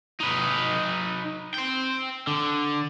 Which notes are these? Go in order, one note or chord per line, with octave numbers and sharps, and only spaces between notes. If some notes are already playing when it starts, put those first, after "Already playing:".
D#4 B4
C5 G5
D3